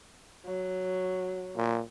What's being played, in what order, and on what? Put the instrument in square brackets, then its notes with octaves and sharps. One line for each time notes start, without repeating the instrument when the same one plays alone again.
[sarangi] F#3
[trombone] A#2